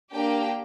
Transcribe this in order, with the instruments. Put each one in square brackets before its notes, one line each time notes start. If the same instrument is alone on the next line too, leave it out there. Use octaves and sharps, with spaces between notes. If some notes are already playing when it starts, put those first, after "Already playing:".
[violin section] A#3 D4 G4 G5